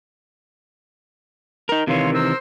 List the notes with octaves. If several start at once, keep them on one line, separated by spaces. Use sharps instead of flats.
D#4 A#4
C3 D#3 E3 C#5 F5 C6
A#4 C5 E6